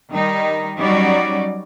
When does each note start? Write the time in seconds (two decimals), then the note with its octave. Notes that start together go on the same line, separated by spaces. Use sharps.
0.11 D#3 G3 D#4
0.78 F#3 G3 C#4 D#4 F#4 D5